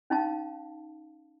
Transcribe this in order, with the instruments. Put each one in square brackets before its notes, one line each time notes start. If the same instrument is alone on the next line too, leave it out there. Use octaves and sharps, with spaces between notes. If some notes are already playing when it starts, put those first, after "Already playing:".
[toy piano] C#4 D#4 F5 A5